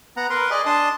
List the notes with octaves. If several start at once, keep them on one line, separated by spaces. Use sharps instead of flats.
B3 F#5 A#5
A#4 B4 C6
G#4 D5 D#5
D4 A5 C6 D#6